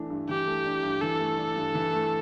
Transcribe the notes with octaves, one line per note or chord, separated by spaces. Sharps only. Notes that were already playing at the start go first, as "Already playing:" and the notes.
Already playing: E3 A3 D4
G2
E3 G4
A3
D4
G2
E3 A4
A3
D4
G2
E3
A3